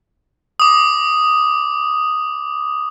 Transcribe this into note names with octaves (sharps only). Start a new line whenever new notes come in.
D6 D#6